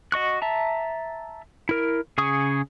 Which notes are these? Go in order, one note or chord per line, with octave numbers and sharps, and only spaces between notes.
F#4 D#5 C#6 F#6
E5 A5 A#5
E4 A#4
C#3 G#4 C#6 D#6